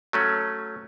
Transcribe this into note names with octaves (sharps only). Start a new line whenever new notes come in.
F#3 A3 C#4